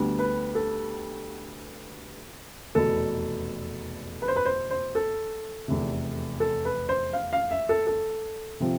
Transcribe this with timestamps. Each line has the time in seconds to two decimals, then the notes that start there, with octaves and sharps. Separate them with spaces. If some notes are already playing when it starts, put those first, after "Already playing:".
Already playing: D2 D3 G3 B3
0.19 B4
0.55 A4
2.75 F1 E2 B2 A4
4.22 B4
4.28 C5
4.36 B4
4.46 C5
4.71 C5
4.95 A4
5.68 F1 E2 C3
6.40 A4
6.65 B4
6.89 C5
7.13 F5
7.33 F5
7.51 E5
7.69 A4
7.87 A4
8.60 C3 F3 C4